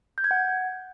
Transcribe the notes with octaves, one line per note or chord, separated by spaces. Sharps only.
G6
G#6
F#5